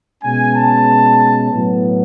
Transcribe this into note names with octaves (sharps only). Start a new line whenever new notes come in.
B2 G#3 C#4 G#5
A5
A2 F#3 B3